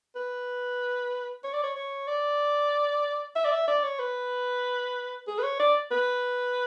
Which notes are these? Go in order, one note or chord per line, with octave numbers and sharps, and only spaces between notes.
B4
C#5
D5
C#5
C#5
D5
E5
D5
E5
D5
C#5
B4
G#4
B4
C#5
D5
B4